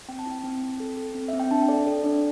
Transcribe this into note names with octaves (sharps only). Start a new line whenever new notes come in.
C4 G5
A5
E4 G5
C4
C4
A4
A4
C4
C4 E5
G5
D4 A5
A4 D5
A4
D4 D5